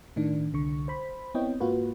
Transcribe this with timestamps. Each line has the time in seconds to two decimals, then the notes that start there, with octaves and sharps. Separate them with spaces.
0.16 A2 D#3 D4
0.53 C2 D3 C#6
0.88 C5 B5
1.34 B3 C4 E4 C#5 D#5 G5
1.60 G#2 A#3 F4 F#4 B4